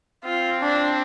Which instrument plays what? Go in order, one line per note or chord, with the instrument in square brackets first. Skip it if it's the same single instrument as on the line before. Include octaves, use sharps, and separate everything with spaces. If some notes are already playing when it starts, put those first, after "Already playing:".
[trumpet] C4 [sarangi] F4
[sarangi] D4